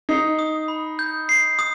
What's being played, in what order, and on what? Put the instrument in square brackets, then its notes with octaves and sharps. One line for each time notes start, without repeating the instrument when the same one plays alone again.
[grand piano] D#4 [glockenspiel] C7
[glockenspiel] D#6
B5
G6
C7
D#6